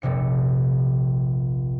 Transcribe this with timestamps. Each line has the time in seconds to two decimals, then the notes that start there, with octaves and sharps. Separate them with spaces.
0.02 F1 A#1 C3 C#7